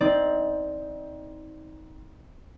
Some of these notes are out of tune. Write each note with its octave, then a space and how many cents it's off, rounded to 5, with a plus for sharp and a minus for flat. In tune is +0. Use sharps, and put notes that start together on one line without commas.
C4 +0 D#4 +25 D5 +0